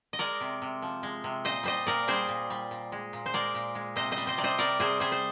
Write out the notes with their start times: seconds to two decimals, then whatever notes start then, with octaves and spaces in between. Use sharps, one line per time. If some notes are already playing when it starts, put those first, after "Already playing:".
0.13 D#5
0.19 G#3 A#4 D5
0.41 C3
0.62 C3
0.82 F3
1.03 G#3
1.24 C3
1.45 A#2 C5 D#5
1.63 G3 C5 D#5
1.87 A#2 A#4 D5
2.08 G3 G#4 C5
2.29 A#2
2.50 G3
2.71 A#2
2.92 G#3
3.13 A#2
3.26 C5
3.34 G#3 A#4 D5
3.54 A#2
3.75 G#3
3.96 C3 C5 D#5
4.12 C5 D#5
4.17 G3
4.27 C5 D#5
4.38 C3 D5
4.44 C5 D#5
4.58 G3 A#4 D5
4.80 C3 G#4 C5
5.00 G3 G#4 C5
5.12 C5